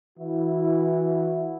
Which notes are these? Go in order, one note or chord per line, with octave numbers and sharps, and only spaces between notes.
E3 E4 F#4